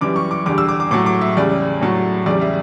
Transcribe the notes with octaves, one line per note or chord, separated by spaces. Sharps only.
F#2 E3 G3 D6
C#6
D6
E2 D3 G3 D6
E6
D6
D6
A2 F#3 A3 D6
D6
E5
E2 C#3 G3 D5
A2 F#3 A3
E2 C#3 G3 D5
E5